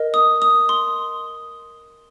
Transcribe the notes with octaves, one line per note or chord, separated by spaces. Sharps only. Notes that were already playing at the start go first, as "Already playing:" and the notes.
Already playing: A#4 D#5
D#6
D#6
C6